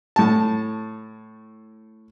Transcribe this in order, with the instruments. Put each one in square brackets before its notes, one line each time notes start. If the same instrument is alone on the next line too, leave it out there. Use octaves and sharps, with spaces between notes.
[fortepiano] A2 A5